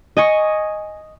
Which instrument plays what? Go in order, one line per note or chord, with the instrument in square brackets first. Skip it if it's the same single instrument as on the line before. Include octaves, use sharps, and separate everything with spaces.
[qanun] D#5 G#5 C#6